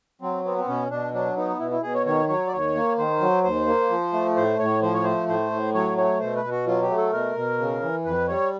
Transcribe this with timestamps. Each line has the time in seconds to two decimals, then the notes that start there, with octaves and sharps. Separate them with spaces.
0.22 F#3 C4
0.45 B3 C4
0.58 C4
0.67 B2 C#4
0.90 B2 D4
1.14 F#3 D4
1.36 B3 D#4
1.59 B2 E4
1.71 E4
1.82 B2 G#4
1.94 C#5
2.06 D#3 C#5
2.29 F#3 C#5
2.47 D5
2.52 D#2 C#5
2.75 A#3
2.98 D#3 C5
3.20 F#3
3.44 D#2 C5
3.67 A#3
3.90 F3
4.13 A3
4.36 A2 C5
4.59 A2 C#5
4.82 F3 C5
4.94 C#5
5.04 A3 C5
5.28 A2 C5
5.52 A2
5.74 F#3 C#5
5.97 A3 C#5
6.20 B2 C5
6.36 B4
6.44 B2
6.51 F#4
6.67 F#3 F4
6.82 G4
6.90 A3
6.97 A4
7.12 B2 A#4
7.36 B2
7.59 C#3
7.82 E3
8.05 F2 B4
8.28 G3 C#5